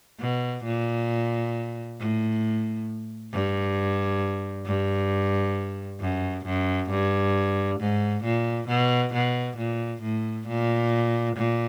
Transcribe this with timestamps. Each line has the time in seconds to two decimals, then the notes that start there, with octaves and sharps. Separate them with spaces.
0.20 B2
0.64 A#2
1.99 A2
3.32 G2
4.66 G2
6.00 F#2
6.46 F#2
6.90 G2
7.80 G#2
8.24 A#2
8.68 B2
9.13 B2
9.57 A#2
10.02 A2
10.48 A#2
11.36 A#2